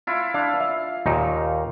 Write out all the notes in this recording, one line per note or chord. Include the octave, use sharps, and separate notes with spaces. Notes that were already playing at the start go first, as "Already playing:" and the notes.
E4 F4
D4 F5
E5
D#2 A#2 D#4